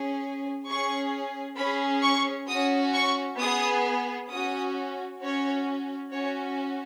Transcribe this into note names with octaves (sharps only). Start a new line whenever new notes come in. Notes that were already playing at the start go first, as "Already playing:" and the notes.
Already playing: C#4 G#4
C#4 G#4 C#6
C#4 G#4 B5
C#6
C#4 F#4 D#6
C#6
B3 G#4 D#6
C#4 F#4 D#6
C#4 F#4 C#5
C#4 F#4 C#5